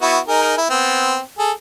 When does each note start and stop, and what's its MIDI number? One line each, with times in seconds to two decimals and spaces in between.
0.01 0.18 59
0.01 0.18 64
0.01 0.18 66
0.28 0.56 63
0.28 0.56 68
0.28 0.56 70
0.58 0.66 64
0.70 1.19 59
0.70 1.19 60
1.38 1.51 68
1.38 1.51 69